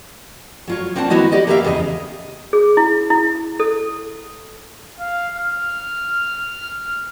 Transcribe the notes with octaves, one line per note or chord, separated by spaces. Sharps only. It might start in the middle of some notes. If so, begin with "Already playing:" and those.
F#3 F4 C#5
A#3 C4 D4 F#5 A5
D#3 B3 E4 F#4 D#5
G4 D5 D#5 F#5
A#3 B3 G4 B4 E5 F5
E2 C#3 G#4 D#5
G#4
E4
E4
A4
F5
F6